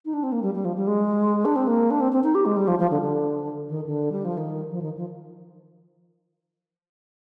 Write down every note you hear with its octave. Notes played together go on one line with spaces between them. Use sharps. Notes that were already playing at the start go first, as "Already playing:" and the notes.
D#4
D4
C4
A#3
G3
G3
F3
G3
G#3
D4
C4
A#3
D4
C4
C4
D#4
G4
G#3
G3
F3
F3
D3
D3
D#3
D3
G3
F3
D#3
F3
D#3
F3